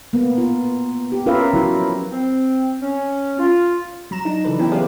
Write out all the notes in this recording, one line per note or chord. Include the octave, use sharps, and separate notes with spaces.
A#3 B3
F4
G4
C#4 F4 A#4 B4 E5 F5
F3 F#3 E4
C4
C#4
F4
F#3 A#5 E7
D4 D#4
C#3 E3 A4 B4
B3 C#4 E4 B4 D5 G5
F#3 G4 G#4 B4 D5 F5